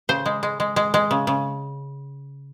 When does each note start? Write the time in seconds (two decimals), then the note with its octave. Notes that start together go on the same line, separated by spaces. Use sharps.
0.09 C#3 C5
0.26 G#3
0.43 G#3
0.60 G#3
0.76 G#3
0.94 G#3
1.11 C#3
1.27 C#3